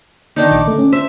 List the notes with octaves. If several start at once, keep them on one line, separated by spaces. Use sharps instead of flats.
D#3 D4 D#4
A#1 D6
D3 A3
C#4
C5 E5